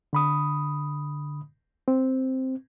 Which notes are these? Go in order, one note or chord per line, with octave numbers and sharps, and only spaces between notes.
D3 B5 D#6
C4